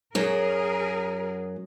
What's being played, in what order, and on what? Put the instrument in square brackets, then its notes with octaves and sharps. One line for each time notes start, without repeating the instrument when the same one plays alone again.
[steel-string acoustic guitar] F#2 F#3 [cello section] G#4 A#4